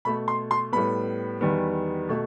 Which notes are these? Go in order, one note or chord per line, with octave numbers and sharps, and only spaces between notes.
B2 A3 B5
C6
C6
A2 G3 B3 B5
E2 D#3 G3 B3
B2 A3